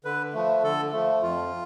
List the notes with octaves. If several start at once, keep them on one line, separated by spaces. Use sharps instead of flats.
D3 B4
F3 A3
D3 A4
F3 A3
F2 F4